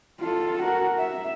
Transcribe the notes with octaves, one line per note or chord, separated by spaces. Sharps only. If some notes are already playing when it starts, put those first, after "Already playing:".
F4 A4
F#4 A#4
E5